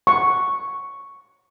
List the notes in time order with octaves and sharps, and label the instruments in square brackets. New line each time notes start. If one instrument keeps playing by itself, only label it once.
[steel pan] C#6